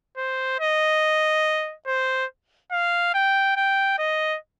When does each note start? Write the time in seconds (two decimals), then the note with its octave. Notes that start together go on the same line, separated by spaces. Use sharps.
0.17 C5
0.60 D#5
1.87 C5
2.72 F5
3.14 G5
3.56 G5
3.99 D#5